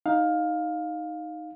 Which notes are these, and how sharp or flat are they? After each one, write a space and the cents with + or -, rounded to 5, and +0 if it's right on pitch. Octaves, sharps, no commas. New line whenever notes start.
D#4 +0 F5 +15